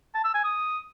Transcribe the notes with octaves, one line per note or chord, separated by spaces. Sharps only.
A5
E6
G#5
D#6